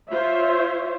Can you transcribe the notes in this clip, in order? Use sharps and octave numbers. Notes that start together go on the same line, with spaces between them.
F4 C5 C#5 E5